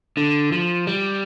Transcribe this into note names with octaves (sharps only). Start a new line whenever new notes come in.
D3
F3
G3